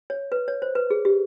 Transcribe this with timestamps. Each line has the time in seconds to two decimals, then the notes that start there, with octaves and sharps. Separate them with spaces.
0.10 C#5
0.32 B4
0.48 C#5
0.62 C5
0.75 B4
0.90 G#4
1.05 G4